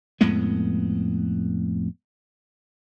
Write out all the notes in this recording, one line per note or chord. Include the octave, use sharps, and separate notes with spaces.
F2 A2 G#3 B3